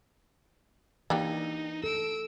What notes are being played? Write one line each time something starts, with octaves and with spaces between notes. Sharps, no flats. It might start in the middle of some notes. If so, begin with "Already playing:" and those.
E3 A#3 D4 D#4 G4
A4 E6 D7